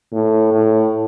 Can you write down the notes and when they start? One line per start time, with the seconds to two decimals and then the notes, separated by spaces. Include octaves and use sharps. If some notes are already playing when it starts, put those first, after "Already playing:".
0.13 A2
0.53 A2